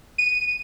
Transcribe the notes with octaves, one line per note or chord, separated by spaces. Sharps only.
D#7